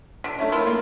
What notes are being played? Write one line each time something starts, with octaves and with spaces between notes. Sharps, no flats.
D3 B6
A3 C#4 E5
E4 F4 A#4
A#3